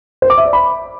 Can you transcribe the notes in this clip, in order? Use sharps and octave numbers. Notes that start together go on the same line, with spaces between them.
C5
D6
E5
D5
B5